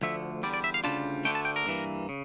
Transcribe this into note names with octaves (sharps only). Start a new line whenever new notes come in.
D2 D3 F3 A3 E5
E2 D3 G3 D5
D5
E5
F5
D2 C#3 G3 D4 F4 A5
D2 D3 A3 G5
A5
G5
A#4
G2 E3 A#3
C#3